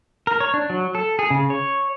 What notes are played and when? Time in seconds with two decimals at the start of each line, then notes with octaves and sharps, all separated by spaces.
0.27 A#4
0.40 C#5
0.54 D4
0.70 F#3
0.95 A4
1.19 G#4
1.30 C#3
1.50 C#5